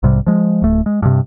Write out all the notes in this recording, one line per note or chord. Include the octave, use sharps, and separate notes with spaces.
B1 G#2 C3 G3
F3 G#3
D1 A3
G#3
G2 C3